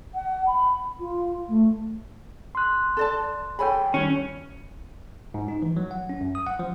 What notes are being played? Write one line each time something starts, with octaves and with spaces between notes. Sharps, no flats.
F#5
B5
F4
A3
C6 F#6
A4 D5 A5
G#4 A4 C#5 G5 G#5 B5
D#3 G3 C#4 E4 F#4
G#2
D#4
E3
F#3
F#5
C#4
F#2
D#6
F#5
F3